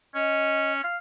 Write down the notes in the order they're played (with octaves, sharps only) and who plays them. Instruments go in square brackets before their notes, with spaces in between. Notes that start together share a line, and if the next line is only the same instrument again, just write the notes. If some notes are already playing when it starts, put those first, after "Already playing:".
[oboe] C#4 [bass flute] D#5
[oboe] F5